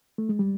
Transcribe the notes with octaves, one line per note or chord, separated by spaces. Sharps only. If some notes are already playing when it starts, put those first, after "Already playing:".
A3
G#3
G3